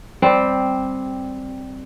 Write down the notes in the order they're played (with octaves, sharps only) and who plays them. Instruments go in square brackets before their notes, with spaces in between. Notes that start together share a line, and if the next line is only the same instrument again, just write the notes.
[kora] G3 C4